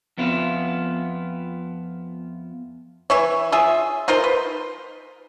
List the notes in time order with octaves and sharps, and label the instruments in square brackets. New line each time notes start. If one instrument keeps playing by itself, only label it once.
[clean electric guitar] F2 B3 E4 F4
[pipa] E3 E4 C#5
F4 G#4 E5
D#4 F4 A#4 C5
B4